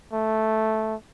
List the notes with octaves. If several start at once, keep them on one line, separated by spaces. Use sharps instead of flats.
A3